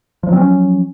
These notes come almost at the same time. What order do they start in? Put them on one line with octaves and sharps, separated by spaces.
F3 F#3 C4 C#4